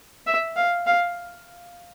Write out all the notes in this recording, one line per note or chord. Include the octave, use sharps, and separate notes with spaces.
E5
F5
F5